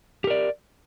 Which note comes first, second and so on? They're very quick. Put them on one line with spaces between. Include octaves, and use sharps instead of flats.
G4 A#4 D5